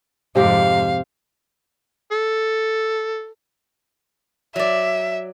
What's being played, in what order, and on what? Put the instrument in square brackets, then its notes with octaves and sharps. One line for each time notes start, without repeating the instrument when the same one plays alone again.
[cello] F2 G#2 [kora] C3 G4 [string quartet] F5
[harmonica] A4
[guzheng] F#3 D5 [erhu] E5